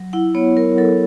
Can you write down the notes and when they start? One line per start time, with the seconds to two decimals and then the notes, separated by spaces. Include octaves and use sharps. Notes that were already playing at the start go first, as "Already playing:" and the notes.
Already playing: F#3
0.13 E4 F#5
0.35 B3 C#5
0.57 F#3 A#4
0.78 F#3 A4